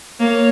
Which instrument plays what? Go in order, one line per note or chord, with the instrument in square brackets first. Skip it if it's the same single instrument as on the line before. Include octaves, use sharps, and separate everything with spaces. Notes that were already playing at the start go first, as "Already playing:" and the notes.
[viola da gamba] A#3 [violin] C#5